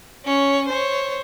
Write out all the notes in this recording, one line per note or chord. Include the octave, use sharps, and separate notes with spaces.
C#4 C#5
C5 C#5